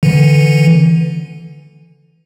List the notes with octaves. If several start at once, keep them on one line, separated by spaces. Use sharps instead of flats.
D3 E3